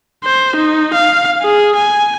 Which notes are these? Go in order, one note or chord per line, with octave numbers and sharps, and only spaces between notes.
C5
D#4
F5
G#4
G#5